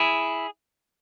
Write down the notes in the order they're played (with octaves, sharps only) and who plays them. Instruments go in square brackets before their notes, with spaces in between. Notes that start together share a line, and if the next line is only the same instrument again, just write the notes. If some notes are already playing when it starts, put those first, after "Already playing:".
Already playing: [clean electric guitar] E4 G#4